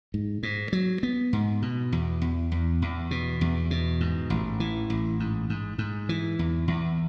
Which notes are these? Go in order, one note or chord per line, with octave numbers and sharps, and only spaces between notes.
G#2
G#2
F#3
B3
G#2
B2
E2
E2
E2
E2
B2
E2
B2
G#2
A1
E3
A1
G#2
G#2
G#2
E3
E2
E2